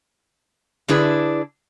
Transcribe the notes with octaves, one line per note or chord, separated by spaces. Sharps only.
D3 D4 E4 G#4 B4